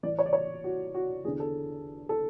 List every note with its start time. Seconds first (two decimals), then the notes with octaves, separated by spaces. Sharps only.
0.03 E3 D5
0.07 A2
0.19 C#5
0.26 D5
0.33 C#5
0.64 F#4
0.95 F#4
1.24 E2 G#4
1.27 D3
1.40 A4
2.09 A4